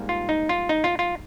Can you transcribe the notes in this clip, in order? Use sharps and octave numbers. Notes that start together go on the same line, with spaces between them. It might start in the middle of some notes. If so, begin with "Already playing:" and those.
Already playing: G#2 G3 A#3
F4
D#4
F4
D#4
F4
F4